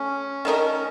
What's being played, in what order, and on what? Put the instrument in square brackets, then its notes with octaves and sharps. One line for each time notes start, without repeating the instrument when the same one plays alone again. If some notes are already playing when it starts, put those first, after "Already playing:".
Already playing: [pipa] A3 [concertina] C#4
[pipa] D#3 A3 D#4 A#4